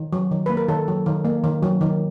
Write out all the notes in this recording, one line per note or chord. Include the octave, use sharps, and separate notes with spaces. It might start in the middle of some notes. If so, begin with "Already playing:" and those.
Already playing: D#3
F#3
D#3
A#3 B4
A#4
D#3 A4
F#3
D#3
A#3
D#3
F#3
D#3